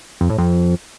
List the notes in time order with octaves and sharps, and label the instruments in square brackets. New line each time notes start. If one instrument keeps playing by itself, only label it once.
[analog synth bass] F2
A2
F2